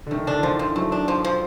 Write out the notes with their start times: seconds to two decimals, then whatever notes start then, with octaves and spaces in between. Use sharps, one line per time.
0.07 D3
0.11 D#3 A3
0.27 D3 D4
0.38 E3
0.43 D#3 F3
0.59 E3 F3
0.76 F#3 A3
0.92 D4
1.08 F3
1.25 F3